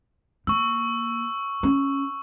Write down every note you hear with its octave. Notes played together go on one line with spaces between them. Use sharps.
A#3 C#6 E6
C#4